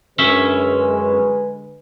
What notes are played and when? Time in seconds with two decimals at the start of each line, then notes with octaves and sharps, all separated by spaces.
0.19 F#2 D3 G#3 C#4 B4 E5